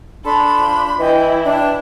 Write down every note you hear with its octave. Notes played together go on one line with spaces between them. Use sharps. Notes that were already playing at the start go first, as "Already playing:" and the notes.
D4 A4 B5 C6
F3
E3 E4 D#5 G5
D4 G5